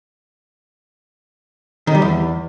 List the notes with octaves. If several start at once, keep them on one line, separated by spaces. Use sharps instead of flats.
D#3
G3
E2